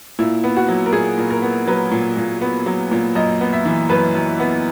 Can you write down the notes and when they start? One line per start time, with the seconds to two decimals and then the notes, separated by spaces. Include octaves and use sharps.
0.19 A#2 E4
0.44 B3
0.57 F#4
0.68 F#3
0.86 A#4
0.93 A#2 G#4
1.18 A#2
1.30 A#4
1.42 B3
1.67 F#3 B4
1.92 A#2
2.17 A#2
2.41 B3
2.66 F#3
2.91 A#2
3.15 F#2 D#5
3.41 B3
3.53 E5
3.66 E3
3.89 F#2 B4
4.15 F#2
4.40 B3